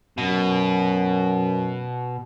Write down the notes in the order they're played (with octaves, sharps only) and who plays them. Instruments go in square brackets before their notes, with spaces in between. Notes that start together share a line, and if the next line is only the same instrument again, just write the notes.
[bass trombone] F#2 [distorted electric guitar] B2